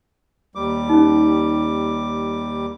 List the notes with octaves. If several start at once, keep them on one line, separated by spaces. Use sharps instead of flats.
D#2 G3 D6
C#4 D#4